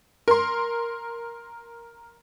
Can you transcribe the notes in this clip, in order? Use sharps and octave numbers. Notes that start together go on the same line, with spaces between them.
A#4 C6